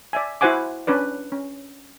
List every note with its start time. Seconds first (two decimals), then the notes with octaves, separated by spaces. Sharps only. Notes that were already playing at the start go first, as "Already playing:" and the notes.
0.13 D5 E5 G#5
0.41 E4 F#4 C5 F#5 G#5 D6
0.87 C#4 D4 B4 D5
1.32 C#4